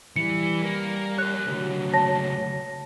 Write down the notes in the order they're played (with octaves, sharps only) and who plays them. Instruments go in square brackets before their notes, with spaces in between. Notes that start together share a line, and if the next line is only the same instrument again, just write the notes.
[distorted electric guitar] E3 [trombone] G3 [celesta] C#7
[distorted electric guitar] A#3
[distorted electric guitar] A#4 C#5 [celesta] F#6
[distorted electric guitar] C#2 A3 [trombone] F#3
[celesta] C#5 A5 A#6